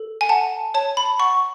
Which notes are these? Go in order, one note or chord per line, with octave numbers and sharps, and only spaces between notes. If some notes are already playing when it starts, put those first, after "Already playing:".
Already playing: A4
G#5
F#5 A5
C#5 A5
B5
F#5 C#6